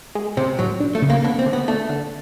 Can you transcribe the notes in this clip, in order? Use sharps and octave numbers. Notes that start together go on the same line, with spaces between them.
G#3
C3 C4
A2 F#3
D4
A3
C#3
A#3
B3 D4
C4
D3
B3
A3 D4
D3